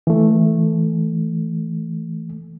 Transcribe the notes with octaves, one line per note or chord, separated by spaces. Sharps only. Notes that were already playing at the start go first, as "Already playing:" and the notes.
E3 A3